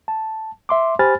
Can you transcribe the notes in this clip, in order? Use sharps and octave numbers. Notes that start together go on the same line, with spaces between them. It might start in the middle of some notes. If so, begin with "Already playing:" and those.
A5
E5 C6 D6
G4 C5 G#5 B5 F6 A6